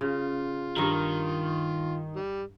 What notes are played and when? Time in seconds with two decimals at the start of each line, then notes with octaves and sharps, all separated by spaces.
0.01 C#3 F4
0.77 G2 D#3 A#4
2.16 G3